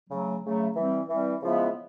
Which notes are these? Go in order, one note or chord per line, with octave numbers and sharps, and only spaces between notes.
C#3 F#3 A3
C#3 F#3 A3
E3 G3 C4
E3 G3 C4
C#3 F3 G#3 B3 E4